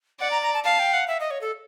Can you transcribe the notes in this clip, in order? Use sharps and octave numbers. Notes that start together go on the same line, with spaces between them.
D5 F#5
A#5
A#5
A5
F5 A5
G5
F#5
E5
D#5
C#5
A4